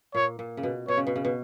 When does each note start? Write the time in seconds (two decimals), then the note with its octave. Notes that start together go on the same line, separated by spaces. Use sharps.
0.15 A#2 C#5
0.39 A#2
0.57 C#3
0.63 B2
0.88 B2 C#5
0.97 C#3
1.07 B2
1.16 C#3
1.25 B2